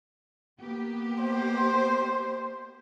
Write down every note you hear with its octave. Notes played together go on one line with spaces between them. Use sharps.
A#3 B3 G4
C5